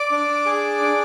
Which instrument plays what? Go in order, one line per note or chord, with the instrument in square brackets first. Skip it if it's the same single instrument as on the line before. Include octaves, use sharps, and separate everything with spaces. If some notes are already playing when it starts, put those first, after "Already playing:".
Already playing: [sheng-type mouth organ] D5 D6
D4
G#4
D4